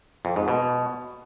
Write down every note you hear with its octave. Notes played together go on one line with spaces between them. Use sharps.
F2
G#2
B2